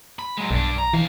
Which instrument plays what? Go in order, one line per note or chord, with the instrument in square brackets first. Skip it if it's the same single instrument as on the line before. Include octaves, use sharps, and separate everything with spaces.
[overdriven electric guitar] B5
F#3 G#3
[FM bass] B1 [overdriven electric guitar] G2 D4
[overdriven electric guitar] A#5
[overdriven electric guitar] B2 F5 [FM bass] E3